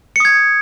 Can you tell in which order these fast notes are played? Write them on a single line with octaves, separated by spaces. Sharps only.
C#7 D#6 G#6